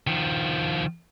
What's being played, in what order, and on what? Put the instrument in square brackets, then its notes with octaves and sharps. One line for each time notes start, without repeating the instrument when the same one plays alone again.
[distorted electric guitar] D#3 F3